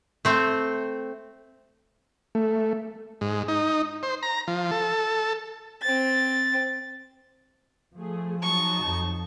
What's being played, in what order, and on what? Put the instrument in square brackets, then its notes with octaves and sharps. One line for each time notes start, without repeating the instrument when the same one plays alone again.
[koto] A3 C4
[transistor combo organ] A3
G#2
D#4
C5
A#5
F3
A4
[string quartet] C4 A6
[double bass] F3 [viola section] A3 G#4
[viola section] F#3 D#4 A5 [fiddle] C#6
[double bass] F2